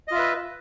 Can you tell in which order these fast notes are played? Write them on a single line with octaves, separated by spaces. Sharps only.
D#5 F4 E5 B4